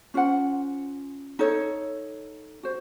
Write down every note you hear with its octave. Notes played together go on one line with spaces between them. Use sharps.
C#4 F4 C5 F#5
D#4 A4 C#5
F#4 C5